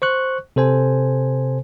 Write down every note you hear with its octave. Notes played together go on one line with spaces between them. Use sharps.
C5 C#6 F#6
C3 A4 C5 G#5